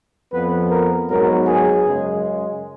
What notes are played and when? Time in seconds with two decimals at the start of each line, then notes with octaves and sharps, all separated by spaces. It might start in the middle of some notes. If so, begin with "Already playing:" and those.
0.33 F2 F3 B3 B4
0.71 A#4
1.09 G#2 F#3 B3 A#4
1.48 G#4
1.86 F#2 C#3 G#3